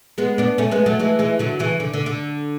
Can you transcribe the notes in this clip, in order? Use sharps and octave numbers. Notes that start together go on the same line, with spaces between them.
G#3 B3
B3 D4
A3 C#4
G#3 B3
F#3 A3
E3 G#3
E3 G#3
D3 F#3
C#3 E3
D3
D3
D3